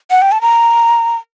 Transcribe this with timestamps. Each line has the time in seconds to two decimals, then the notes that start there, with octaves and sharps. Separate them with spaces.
0.11 F#5
0.22 G5
0.32 A5
0.41 A#5